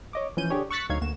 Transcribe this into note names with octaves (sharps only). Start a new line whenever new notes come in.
C#5 D#5 D6
E3 F3 C#4 G6 D#7
D3 D4 G4 G#4 C#5
C#6 E6 F#6 A6 B6 C#7
D2 F#3 D#4 C#5 F5 G#6
D2 A#3 F#4 E7